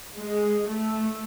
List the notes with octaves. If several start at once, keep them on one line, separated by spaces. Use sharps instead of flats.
G#3
A3